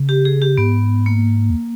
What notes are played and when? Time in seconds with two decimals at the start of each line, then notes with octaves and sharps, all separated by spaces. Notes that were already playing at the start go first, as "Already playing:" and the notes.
Already playing: C#3
0.09 G4
0.25 G#4
0.42 G4
0.58 G#2 B3
1.06 A#3
1.50 E2